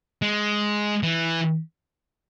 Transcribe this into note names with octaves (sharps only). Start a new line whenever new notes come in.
G#3
E3